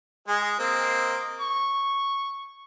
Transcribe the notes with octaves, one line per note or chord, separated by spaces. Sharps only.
G#3 G#4 D#5
A#3 C4 D#5
C#6